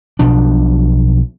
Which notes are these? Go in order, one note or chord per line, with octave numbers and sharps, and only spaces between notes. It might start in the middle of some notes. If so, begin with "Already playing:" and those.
B1 B2 F3 D4